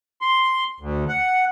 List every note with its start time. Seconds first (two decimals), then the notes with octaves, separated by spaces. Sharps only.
0.21 C6
0.80 D2
1.08 F#5